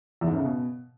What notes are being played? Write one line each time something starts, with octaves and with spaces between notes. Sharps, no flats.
E2
G#2
F#2
C#3
B2